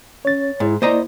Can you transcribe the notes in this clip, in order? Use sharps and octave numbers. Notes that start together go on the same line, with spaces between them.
C#4 C#5 A6
G#2 E4
A#3 E4 C5 D5 D#5 A#5